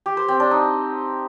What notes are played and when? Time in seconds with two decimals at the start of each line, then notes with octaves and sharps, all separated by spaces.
0.06 G4
0.17 C5
0.28 C4
0.40 D4
0.51 D#4